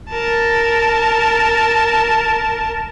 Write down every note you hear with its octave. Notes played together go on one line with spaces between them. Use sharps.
A#4 A5